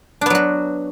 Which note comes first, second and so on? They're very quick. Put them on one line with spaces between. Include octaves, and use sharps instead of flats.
D4 B3 F#3 F#4